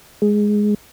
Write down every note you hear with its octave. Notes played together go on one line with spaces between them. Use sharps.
G#3